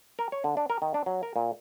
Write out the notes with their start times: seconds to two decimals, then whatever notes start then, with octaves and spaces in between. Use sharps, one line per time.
0.19 A#4
0.32 C#5
0.44 D3
0.57 D4
0.70 A#4
0.82 D#3
0.94 D4
1.06 F#3
1.23 A#4
1.36 A#2